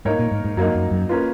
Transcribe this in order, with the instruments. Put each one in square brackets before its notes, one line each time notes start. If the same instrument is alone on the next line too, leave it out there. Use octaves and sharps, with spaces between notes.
[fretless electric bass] G#2 [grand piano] A#3 D#4 A#4 C#5
[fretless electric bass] A#2
G#2
G#2
[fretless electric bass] F#2 [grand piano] F#3 A#3 D#4
[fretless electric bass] F#2
F#2
[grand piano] A#3 C#4 F4 B4